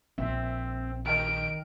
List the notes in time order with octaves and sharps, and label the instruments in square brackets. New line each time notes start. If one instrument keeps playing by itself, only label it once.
[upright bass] A#1 [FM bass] C4 [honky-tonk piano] E5
[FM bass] D#3 [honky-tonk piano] D#5 G5 F6 [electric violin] D7